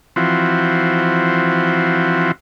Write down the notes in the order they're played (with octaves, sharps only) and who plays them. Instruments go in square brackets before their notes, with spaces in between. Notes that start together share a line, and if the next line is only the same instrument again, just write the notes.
[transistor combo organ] E3 F3 C4 F#4